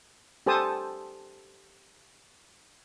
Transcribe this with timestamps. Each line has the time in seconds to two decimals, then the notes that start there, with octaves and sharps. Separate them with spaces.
0.46 G4 A4 C5 G#5 A5 D#6